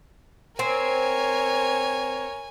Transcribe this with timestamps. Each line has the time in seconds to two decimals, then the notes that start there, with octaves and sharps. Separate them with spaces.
0.59 C4 A#4 C#5 G#5